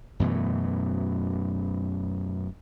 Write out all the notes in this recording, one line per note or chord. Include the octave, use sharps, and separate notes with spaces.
F#2 B2 E3 A3